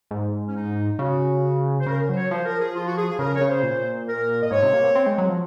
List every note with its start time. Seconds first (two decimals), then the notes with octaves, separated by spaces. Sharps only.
0.11 G#2
0.47 C#4
0.55 D#4
0.99 C#3 F#4
1.80 C5
1.86 C#3 A#4
2.09 F#3 C5
2.16 C#5
2.31 F3 C5
2.45 A#4
2.60 G#4
2.74 F4
2.86 F#4
2.97 G#4
3.08 G#4
3.19 C#3 A#4
3.34 C#5
3.41 C#3
3.48 C5
3.63 A#2
4.07 A#4
4.42 D#5
4.51 G#2 C#5
4.62 C3
4.73 A#3
4.84 C4
4.95 C4
5.06 G#3
5.18 F#3
5.29 F3